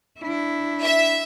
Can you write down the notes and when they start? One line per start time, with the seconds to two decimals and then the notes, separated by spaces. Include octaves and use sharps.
0.20 D4 E4
0.83 E5